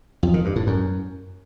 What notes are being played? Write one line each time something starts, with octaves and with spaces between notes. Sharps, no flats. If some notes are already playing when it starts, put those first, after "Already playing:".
F2
D#3
G2
A2
F#2